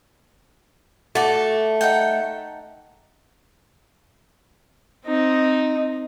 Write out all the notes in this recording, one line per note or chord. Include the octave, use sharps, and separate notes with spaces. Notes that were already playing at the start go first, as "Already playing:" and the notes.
A3 F#4 D5
D#4 F#5 G5
C4 D#4